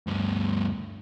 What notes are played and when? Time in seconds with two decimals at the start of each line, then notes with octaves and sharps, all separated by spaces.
0.07 D2 G2